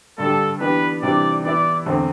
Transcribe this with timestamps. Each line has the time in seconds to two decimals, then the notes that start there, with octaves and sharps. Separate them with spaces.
0.18 G2 D3 G3 A4
0.60 E3 B3 D4 G4 B4
1.02 C3 E3 G3 D4 D5
1.44 E3 B3 E4 D5
1.86 E2 D3 A3 C4